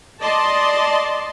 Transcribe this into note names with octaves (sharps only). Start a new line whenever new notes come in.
D5 D#5 A5 C6